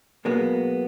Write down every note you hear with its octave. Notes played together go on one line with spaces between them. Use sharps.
B2 F#3 G#3 A#3 B3